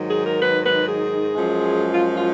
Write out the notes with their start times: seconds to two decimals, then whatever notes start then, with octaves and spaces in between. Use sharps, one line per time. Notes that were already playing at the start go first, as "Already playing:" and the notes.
Already playing: G#2 D#3 F#3
0.09 G#4
0.25 A#4
0.41 B4
0.64 B4
0.87 G#4
1.34 F#2 F3 G#3
1.92 F4
2.16 F4